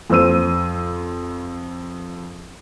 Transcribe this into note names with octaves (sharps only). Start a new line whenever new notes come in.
F2 C5 E6 D#7